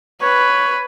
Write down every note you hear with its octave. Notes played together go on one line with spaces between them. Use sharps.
B4 C#5